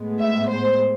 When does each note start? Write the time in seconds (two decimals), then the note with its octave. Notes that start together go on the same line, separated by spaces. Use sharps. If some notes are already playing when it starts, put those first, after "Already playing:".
Already playing: A2 G#3 B3
0.20 E5
0.49 C5